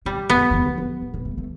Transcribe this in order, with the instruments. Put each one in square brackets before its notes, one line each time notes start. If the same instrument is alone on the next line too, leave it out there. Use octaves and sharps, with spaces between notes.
[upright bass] C3 [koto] G3
[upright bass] F2 [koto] B3
[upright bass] E2
F2
E2
F2
A2
B2
A3
A3